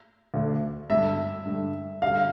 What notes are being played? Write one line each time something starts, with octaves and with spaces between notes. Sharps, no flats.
D2 D3 A3 D4
G2 D3 G3 E5
G2 D3 G3
G2 D3 G3 F5